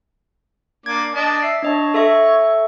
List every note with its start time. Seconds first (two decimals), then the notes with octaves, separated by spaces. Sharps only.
0.86 A#3 D4 D6 G#6
1.15 D4 D#5 A5
1.42 E5 C7
1.62 D4 C#5 D#5 A5
1.94 A4 E5 C#6